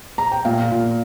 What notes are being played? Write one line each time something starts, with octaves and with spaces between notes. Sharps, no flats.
A#5
G5
A#2 F5
A#2